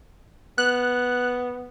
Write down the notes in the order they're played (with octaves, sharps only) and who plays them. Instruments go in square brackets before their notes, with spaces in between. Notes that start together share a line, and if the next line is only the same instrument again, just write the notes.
[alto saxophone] B3 [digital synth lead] F#6